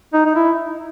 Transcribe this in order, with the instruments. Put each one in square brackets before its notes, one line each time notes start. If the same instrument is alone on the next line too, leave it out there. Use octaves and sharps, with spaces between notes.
[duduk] D#4
D#4
E4